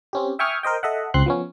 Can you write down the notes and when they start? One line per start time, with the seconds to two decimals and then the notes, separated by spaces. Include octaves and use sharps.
0.13 C4 C#4 G4
0.39 E5 G5 G#5 C#6 D#6 F6
0.63 A#4 C5 D#5 G5
0.83 A4 D#5 E5 F#5
1.14 C#2 C4 C6 F#6
1.26 F3 B3 C#4